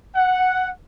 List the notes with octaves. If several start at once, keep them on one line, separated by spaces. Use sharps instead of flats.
F#5